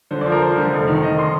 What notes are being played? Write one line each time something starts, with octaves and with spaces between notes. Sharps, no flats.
D3 C5
F3 D5
A#4
F3 C5
D3
F1
D#3
D#3 D#5
C6